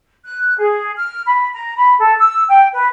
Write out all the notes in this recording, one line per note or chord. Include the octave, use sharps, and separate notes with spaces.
F#6
G#4
F6
B5
A#5
B5
A4
E6
G5
B4